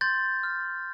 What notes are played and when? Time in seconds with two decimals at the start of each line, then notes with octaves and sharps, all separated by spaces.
0.01 C6 G6 A6
0.43 F6